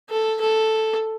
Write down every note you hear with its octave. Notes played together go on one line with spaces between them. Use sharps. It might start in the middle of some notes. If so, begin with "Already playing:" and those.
A4
A4